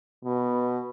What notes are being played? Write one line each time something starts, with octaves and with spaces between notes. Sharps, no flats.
B2